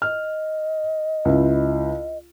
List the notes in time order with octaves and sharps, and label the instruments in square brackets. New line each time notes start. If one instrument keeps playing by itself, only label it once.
[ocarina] D#5 [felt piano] F6
[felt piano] C#2 E4